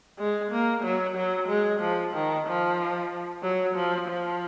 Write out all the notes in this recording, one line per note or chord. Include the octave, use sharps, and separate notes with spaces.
G#3
A#3
F#3
F#3
G#3
F3
D#3
F3
F#3
F3
F3